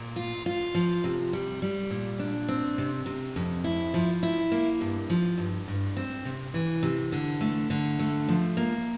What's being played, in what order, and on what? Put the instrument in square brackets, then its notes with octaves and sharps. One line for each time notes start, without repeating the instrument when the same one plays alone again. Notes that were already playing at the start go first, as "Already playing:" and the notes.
Already playing: [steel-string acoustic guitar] A#2
F4
F4
F3
C3
G3
G3
A#2
D4
C4
C3
C3
F2
E4
F3
E4
A#3
G2
F3
G2
G2
C4
C3
E3
C3
D3
A3
D3
A3
F3
A#3